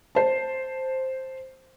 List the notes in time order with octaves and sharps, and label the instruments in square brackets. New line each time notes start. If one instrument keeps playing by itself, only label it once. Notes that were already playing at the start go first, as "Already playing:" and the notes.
[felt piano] C5 A5